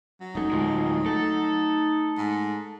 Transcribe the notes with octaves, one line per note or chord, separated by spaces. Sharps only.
F#3
E1 A3 C#4 D#4
D1 D2 F3 G#3
A3 A4
G#2